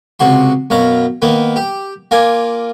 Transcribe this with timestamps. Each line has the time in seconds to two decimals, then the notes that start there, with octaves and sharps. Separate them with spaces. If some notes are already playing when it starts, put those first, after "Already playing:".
0.20 C#2 C3 F#4 C6
0.70 F#2 B2 F5 A#5
1.22 D#3 A#3 B3
1.56 G4
2.11 A#3 F4 D5 G#5